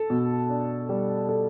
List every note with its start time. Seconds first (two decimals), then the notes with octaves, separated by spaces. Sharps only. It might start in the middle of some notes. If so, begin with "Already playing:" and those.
Already playing: A4
0.10 B2
0.49 D4
0.89 G3
1.29 A4